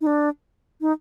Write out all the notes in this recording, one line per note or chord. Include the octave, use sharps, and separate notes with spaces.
D#4
D4
D#4